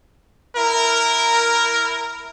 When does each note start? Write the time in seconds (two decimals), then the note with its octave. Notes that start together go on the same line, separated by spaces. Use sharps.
0.56 E4 A#4